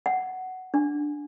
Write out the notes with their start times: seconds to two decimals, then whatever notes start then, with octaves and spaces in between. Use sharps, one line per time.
0.06 F#5
0.74 D4